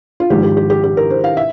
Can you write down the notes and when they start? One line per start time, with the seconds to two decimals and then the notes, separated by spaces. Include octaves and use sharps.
0.20 F4
0.30 G#1 G#2 F3 G4
0.43 G4
0.57 G4
0.70 G4
0.84 G4
0.97 A#4
1.11 C5
1.24 F5
1.37 E5